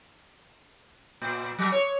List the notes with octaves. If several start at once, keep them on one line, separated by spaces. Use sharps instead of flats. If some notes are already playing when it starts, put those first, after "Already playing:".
A#2
F#3
C#5